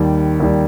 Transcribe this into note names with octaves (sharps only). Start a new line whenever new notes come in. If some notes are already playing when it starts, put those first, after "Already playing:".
Already playing: D#2 D#3 G3
D#2 D#3 G3